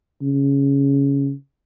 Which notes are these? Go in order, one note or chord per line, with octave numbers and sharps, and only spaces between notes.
C#3